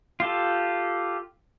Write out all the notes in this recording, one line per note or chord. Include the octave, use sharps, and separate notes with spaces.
F4 G4 A4